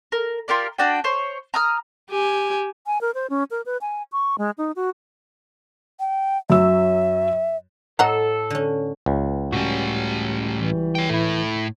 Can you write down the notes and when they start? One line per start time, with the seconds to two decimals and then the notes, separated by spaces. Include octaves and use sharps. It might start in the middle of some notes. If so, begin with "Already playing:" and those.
0.12 A#4
0.48 F4 G4 A#4 D5
0.78 D4 F#4 D5 G5
1.04 C5 C#5
1.54 A#5 D#6 F6
2.10 G4 G#5
2.86 G#5
3.01 A#4
3.14 C5
3.30 C#4
3.51 A#4
3.66 B4
3.81 G#5
4.12 C#6
4.38 G#3
4.58 D#4
4.76 F#4
6.00 G5
6.50 F#2 F#3 E5 E6
7.99 A2 A4 D#5 F#5 A#5
8.50 D3 C#4
9.06 C#2
9.53 A2 G3 C#4 F#4
10.58 E3
10.95 C#5 G5
11.09 A2 A3 E4